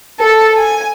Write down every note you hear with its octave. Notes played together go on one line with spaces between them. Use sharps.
A4
G#5